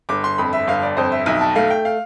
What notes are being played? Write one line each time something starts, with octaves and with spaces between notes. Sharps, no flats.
G1 D6
C6
F2 B5
E5
G1 F5
D5
F2 C5
E5
B1 E5
A5
A3 F5
G5
F5